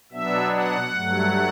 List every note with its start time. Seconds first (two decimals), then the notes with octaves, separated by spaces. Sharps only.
0.12 B2 F#3 B3 D4 E5
0.52 F#5
0.93 G2 F#3 A3